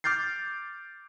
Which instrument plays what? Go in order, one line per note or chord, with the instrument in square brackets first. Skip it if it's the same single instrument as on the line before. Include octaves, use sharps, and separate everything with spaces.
[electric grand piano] D6 F6 G6 A6 C7